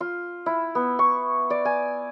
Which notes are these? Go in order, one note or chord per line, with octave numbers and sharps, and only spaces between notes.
F4
E4
B3
C#6
D5
G#5